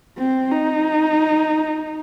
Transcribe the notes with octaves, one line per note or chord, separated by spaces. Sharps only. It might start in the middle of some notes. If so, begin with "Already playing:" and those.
C4
D#4